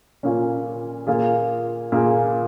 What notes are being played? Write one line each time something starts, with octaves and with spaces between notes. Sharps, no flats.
A#2 A#3 C#4
A#2 A#3 F4 G#4
A#2 A#3 F4 G#4